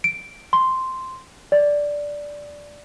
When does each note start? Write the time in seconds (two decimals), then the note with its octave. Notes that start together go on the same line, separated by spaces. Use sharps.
0.04 D7
0.53 C6
1.52 D5